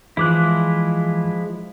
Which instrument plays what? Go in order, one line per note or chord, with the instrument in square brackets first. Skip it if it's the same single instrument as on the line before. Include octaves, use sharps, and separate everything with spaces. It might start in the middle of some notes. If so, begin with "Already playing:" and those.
[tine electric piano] E3 D6 F#6 [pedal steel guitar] F3 G#3 E4